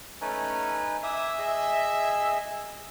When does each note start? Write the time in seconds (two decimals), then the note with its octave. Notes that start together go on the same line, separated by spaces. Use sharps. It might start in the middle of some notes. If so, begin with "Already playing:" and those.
0.21 A3 C#4 D#4 B4 G#5
1.04 E5 G#5 D6 D#6
1.39 G#4 D#5